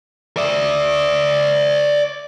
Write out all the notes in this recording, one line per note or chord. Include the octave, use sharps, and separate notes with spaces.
D5 E5